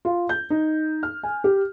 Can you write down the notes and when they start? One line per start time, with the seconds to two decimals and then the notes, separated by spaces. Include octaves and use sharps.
0.05 F4
0.29 G6
0.50 D#4
1.03 F6
1.23 G#5
1.44 G4